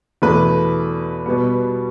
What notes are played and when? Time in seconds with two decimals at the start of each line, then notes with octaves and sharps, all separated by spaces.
0.22 E2 B2 A3 B4
1.26 B2 G3 B3